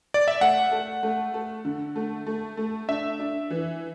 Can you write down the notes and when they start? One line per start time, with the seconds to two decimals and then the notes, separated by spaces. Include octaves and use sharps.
0.14 D5
0.28 E5
0.41 A3 F#5
0.71 A4
1.03 A3
1.34 A4
1.65 D3
1.96 A3
2.26 A3
2.57 A3
2.88 D4 E5
3.19 D4
3.50 E3